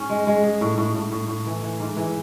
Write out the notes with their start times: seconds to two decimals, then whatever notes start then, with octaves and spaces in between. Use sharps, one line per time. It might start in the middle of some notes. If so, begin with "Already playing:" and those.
Already playing: G#2 C#4
0.10 G#3
0.27 G#3
0.44 G#4
0.61 A2
0.78 A2
0.95 A2
1.12 A2
1.28 A2
1.46 E3
1.63 E3
1.80 G#2
1.97 E3